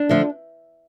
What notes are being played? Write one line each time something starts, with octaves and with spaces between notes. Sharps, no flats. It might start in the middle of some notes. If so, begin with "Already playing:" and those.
Already playing: D4
D3 F3 A3